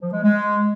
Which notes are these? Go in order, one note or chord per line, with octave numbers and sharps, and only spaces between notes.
F3
G#3
G#3